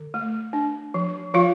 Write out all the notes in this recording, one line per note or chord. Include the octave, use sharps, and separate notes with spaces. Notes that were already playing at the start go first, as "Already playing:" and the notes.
Already playing: D3
A3
D4
F3
F3 F4 F5